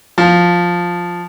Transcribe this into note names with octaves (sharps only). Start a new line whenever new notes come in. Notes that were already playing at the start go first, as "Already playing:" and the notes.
F3